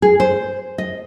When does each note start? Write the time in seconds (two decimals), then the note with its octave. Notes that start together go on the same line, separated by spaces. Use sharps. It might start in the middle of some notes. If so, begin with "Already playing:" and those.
0.02 G#4
0.20 C5
0.78 D#5